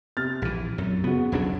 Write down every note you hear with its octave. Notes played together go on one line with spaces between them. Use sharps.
C3 F6 A6
A#1 E3
F#2
C#3 B3 F#4
D#1 B1 D4